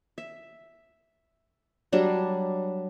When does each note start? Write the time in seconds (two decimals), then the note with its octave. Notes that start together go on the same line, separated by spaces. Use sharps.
0.18 E5
1.92 F#3 G3 D4